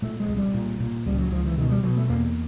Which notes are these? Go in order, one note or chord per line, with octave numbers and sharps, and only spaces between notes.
A#2 A3
G#3
C2
G3
A#2
A#2
C#2 G3
F#3
C#2 F3
E3
B2 D#3
G3
B2 F#3
A3
E2 A#3